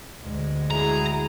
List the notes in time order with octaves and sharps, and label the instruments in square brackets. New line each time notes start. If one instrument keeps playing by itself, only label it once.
[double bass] D2 [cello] G#3
[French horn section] E4 F#4 G#4 [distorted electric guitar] A#5